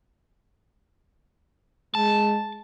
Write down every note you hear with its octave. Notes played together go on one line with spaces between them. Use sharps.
G#3 A5